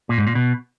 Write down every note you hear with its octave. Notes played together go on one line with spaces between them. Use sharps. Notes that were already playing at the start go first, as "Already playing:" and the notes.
A#2
G#2
A#2
B2